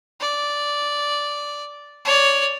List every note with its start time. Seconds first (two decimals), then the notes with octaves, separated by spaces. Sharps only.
0.20 D5
2.05 C#5 D5